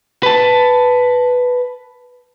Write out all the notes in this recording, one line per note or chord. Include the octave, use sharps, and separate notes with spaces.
B4 A5